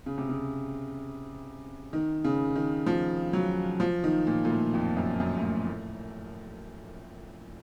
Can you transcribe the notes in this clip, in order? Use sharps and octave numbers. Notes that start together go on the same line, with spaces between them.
C#3
C3
C#3
D#3
C#3
D#3
F3
F#3
F3
D#3
A#2
A#2
A2
F2
F#2
F#2
A2
F#2
A2